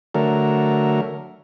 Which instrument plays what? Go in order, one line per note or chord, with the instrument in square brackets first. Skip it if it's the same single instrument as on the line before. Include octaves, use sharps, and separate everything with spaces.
[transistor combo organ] D3 F#3 A3 A#4